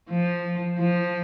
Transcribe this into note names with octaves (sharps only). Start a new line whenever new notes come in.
F3
F3